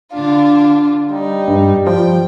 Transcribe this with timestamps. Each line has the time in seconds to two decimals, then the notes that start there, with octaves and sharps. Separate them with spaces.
0.12 D3 D4 F4 F5
1.10 G3 D#4
1.48 G2
1.87 F3 G5